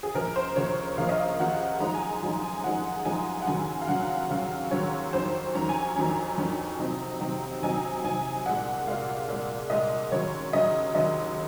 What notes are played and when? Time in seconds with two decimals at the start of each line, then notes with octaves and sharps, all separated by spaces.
0.03 G#4
0.14 C#2 C#3 F3 A#3 A#4
0.36 C5
0.56 C#2 C#3 F3 A#3 C#5
0.98 C#2 C#3 F3 A#3 F5
1.09 D#5
1.20 F5
1.39 C#2 C#3 F3 A#3 F#5
1.80 F#2 F3 G#3 D#4 A#5
1.94 G#5
2.22 F#2 F3 G#3 D#4
2.43 G#5
2.64 F#2 F3 G#3 D#4 F#5
3.05 F#2 F3 G#3 D#4 G#5
3.42 F#5
3.47 D#2 C#3 F#3 C#4 G#5
3.81 F5
3.88 D#2 C#3 F#3 C#4 F#5
4.30 D#2 C#3 F#3 C#4 F5
4.71 D#2 C#3 F#3 C#4 C#5
5.13 F2 D#3 F#3 C#4 C5
5.54 F2 D#3 F#3 C#4 A#5
5.69 G#5
5.82 G#5
5.96 F2 D#3 F#3 C#4 A#5
6.37 F2 D#3 F#3 C#4
6.79 C3 F#3 C4 D#4
7.20 C3 F#3 C4 D#4
7.62 C3 F#3 C4 D#4 G#5
8.03 C3 F#3 C4 D#4 G#5
8.46 C2 A#2 G#3 F#5
8.87 C2 A#2 G#3 F5
9.28 C2 A#2 G#3
9.70 C2 A#2 G#3 D#5
10.12 D#2 C#3 F#3 C#5
10.53 D#2 C#3 F#3 D#5
10.95 D#2 C#3 F#3 D#5